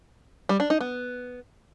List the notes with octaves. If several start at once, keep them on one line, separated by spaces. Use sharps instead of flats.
G3
D4
D#4
B3